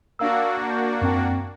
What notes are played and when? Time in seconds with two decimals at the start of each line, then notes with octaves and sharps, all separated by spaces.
0.19 A#3 D4 F#4 F5 E6
0.70 G6
1.02 F#2 C4 G5